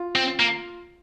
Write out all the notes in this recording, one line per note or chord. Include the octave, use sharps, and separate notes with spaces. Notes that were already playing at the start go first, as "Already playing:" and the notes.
Already playing: F4
C4
A#3